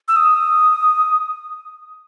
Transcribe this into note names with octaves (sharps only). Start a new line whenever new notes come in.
E6
D#6